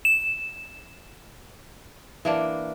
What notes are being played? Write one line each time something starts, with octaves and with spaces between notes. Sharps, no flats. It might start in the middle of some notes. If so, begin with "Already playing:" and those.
E7
E3 A#3 D4